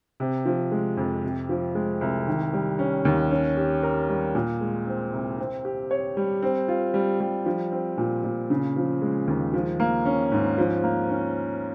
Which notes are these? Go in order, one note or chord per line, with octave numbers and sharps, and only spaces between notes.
C3
F3
G#3
F2
C3
F3
G#3
C2
D#3
G3
C#4
D#2
C#4
G4
A#4
G3
A#2
G#3
C4
C2
C4
G4
C#5
G3
C4
F4
G3
G3
F3
C4
A#2
A#2
C#3
F3
G#3
D#2
F3
A#3
C#4
G#2
F3
A#3
C#4